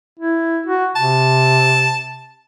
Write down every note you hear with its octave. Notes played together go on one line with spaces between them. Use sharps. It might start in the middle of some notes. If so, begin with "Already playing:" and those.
E4
F#4
C3 A5